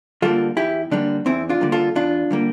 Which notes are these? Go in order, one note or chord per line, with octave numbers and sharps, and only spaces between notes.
D3 G3 A#3 F4 A4
E2 E4 G4
D3 G3 A#3 D4
E2 C4 E4
D4 F4
D3 G3 A#3
F4 A4
E2 D4 F4
D3 G3 A#3